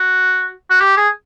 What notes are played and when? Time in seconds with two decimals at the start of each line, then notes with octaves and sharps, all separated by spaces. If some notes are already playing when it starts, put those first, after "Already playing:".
Already playing: F#4
0.70 F#4
0.81 G4
0.97 G#4